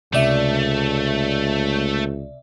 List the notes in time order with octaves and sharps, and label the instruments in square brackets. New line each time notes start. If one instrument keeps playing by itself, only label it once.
[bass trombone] C#2 [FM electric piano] C3 D5 E5 [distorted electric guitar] A3